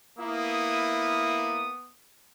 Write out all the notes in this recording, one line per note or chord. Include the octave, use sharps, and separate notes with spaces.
A#3 B3 E4 D#6